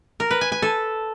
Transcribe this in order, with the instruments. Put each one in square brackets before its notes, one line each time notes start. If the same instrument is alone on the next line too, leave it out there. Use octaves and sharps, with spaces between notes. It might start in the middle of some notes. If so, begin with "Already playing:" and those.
[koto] A#4
B4
G#5
G#5
A4